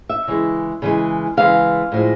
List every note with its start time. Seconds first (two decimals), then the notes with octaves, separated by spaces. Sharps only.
0.09 E5
0.27 C#3 E3 G#3
0.82 C#3 E3 G#3
1.37 C#3 E3 G#3 F5
1.92 A2 F3 G#3